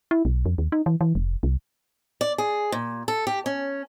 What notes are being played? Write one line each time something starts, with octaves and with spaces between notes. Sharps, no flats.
E4
B1
F2
D#2
D#4
E3
E3
F1
C2
D5
G#4
A#2
A4
G4
C#4